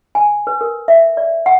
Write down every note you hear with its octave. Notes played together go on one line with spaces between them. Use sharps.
G#5
B4
A#4
E5
D5
F#5